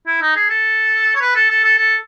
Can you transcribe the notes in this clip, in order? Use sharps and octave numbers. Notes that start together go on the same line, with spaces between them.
E4
D#4
G#4
A4
C#5
B4
A4
A4
A4
A4